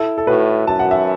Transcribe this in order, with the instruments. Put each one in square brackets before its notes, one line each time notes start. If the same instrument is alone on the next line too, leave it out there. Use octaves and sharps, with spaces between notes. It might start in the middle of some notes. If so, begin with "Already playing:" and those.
Already playing: [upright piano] E4 A4
A4
[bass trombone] A2 [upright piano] F#4 B4
[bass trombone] F#2 [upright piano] A5
[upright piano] F#5
E5